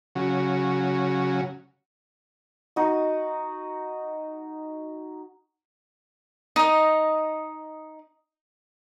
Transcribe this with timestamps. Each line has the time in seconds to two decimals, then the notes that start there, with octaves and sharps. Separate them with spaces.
0.15 C#3 F#3
2.76 D#4 F#4
6.56 D#4 D#5